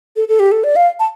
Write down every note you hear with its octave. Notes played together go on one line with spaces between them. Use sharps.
A4
A4
G4
A4
D5
F5
A5